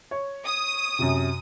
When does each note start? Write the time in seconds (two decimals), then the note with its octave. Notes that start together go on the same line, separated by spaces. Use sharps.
0.11 C#5
0.45 D#6
0.99 F#2 C3